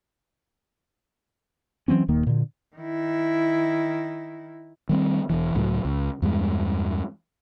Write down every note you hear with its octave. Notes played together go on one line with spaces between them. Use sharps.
E3 F#3 C4 C#4
D#1 D#2 D#3 A#3
A#2 D3
D#3 E4
D#3 G3 C4
E1 E3
C#2 A2 F#3 A3
C#2
E2 G2 G#3